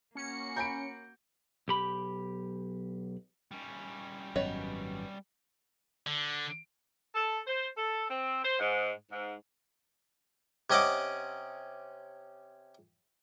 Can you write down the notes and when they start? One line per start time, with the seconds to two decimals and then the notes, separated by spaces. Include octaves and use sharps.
0.15 A#3 C#4 F#4 C#7
0.56 A#4 G#5 B5 G6 D7
1.68 B1 G4 B5
3.51 G3 C#4
4.36 G#1 F#2 B3 C#5 D#5
6.06 D3
7.15 A4
7.47 C5
7.78 A4
8.10 C4
8.43 C5
8.59 G#2
9.12 G#2
10.70 C3 C#4 D#5 F#5 D6